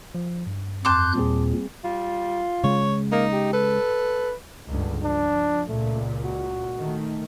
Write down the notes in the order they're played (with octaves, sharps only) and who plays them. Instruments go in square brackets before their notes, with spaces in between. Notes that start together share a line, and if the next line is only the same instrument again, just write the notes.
[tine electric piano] F3
G2
[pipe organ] F2 F#6 G6 [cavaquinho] A5 C6 D6
[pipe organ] D#2 A#2 [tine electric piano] G3 C4 G#4
[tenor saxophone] G3 [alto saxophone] F4
[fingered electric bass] C#3 G#3 [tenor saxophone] C#5
[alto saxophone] A#3 [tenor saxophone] D#4
[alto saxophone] G4
[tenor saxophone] A4 [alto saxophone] B4
[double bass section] C#2 G2 D3
[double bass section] F3 [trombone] D4
[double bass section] C#2 A#2 [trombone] A3
[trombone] F#4
[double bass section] D#3 A3